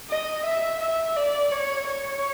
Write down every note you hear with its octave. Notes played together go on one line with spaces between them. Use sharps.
D#5
E5
E5
D5
C#5
C#5